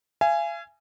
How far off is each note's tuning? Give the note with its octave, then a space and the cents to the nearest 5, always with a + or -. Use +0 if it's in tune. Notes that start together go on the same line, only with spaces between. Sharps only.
F5 -45 G#5 +0